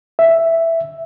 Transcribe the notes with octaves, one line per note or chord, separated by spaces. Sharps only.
E5